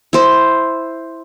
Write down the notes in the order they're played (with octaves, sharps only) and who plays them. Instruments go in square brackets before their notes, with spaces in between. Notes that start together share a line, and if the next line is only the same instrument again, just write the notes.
[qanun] E4 C5